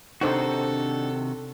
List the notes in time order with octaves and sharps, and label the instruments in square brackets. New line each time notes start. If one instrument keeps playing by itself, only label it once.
[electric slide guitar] C3 D#3 F#4 [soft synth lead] D4 [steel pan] D#4 C5 [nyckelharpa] A4